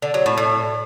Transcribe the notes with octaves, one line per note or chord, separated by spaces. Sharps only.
D3
F#3
A2
A2